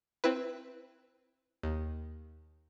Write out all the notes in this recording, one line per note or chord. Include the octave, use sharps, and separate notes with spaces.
C4 E4 B4
D#2